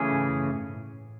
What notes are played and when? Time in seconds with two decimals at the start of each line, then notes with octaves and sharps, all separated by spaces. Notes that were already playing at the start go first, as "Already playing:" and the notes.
Already playing: C#3 E3 A3 C#4 G#4
0.12 G#2
0.28 E2
0.33 F#2
0.54 G#2
0.69 G#2
0.75 A2